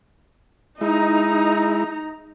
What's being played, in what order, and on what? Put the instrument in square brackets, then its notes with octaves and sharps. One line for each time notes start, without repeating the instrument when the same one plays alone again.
[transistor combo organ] G#3 E4 [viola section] D#4 A#5